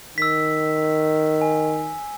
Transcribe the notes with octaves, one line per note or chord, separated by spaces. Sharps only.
D#3 E6 B6
G#5